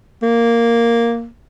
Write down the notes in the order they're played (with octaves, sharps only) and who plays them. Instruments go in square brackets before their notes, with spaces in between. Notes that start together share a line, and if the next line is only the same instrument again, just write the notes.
[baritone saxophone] A#3